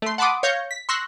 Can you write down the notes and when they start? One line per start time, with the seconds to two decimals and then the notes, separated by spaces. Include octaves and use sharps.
0.02 A3 C6
0.18 F#5 A5 B5 C6 D6 D#6
0.43 C#5 F5 G6 A#6 C#7
0.71 B6
0.89 C6 C#6 E6 F#6 A#6